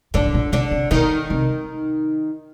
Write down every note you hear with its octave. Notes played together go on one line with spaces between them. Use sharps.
A2 D3 D4
B2
A#2
B2 D3 D4
C3
B2 D#3 D#4
C3